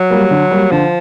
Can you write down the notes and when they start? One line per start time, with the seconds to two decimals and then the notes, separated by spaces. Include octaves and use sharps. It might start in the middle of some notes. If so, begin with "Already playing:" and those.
Already playing: F#3
0.10 G3 A#3
0.31 D3
0.51 G3 A#3
0.71 D3 F3